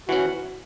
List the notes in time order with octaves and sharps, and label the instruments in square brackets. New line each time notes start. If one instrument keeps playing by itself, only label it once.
[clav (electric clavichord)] E3 C#4 [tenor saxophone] F#4